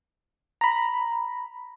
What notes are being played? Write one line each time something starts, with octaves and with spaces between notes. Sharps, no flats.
A#5 B5